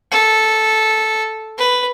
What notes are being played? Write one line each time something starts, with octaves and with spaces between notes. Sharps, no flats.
A4
B4